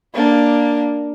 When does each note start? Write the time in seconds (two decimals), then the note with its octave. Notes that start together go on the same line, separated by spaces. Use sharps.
0.15 A#3 D4